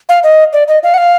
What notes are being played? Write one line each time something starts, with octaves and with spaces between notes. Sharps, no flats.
F5
D#5
D5
D#5
F5
F#5
F5